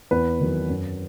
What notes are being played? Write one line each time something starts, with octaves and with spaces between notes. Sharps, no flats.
E2 B4
D#3 F#3
F#2